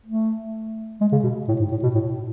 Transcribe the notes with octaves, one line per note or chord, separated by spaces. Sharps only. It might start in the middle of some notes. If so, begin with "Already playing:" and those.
A3
G#3
C#3
B2
A2
G#2
A2
B2
A2